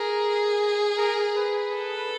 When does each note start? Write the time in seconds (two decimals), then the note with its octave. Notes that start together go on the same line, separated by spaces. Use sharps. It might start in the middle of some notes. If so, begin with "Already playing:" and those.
Already playing: G#4 A#4
0.97 A#4
1.37 B4
1.75 A4